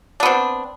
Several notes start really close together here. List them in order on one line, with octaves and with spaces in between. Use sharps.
D4 B3 C4